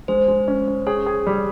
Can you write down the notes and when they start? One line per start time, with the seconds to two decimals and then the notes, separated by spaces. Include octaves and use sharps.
0.08 G#3 C5
0.28 G#3
0.48 C#4
0.68 C#4
0.87 G#4 C#5
1.06 G#4
1.27 G3